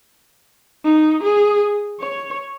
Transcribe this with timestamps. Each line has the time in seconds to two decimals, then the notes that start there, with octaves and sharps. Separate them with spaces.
0.85 D#4
1.23 G#4
2.01 C#5